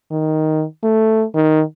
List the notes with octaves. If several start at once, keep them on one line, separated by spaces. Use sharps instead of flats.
D#3
A3
D#3